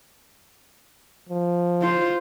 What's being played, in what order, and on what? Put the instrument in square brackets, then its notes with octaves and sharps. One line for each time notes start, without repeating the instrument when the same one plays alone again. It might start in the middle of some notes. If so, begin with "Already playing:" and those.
[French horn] F3
[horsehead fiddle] F4 C5